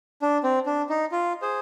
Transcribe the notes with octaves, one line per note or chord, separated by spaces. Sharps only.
D4
C4
D4
D#4
F4
G#4 C5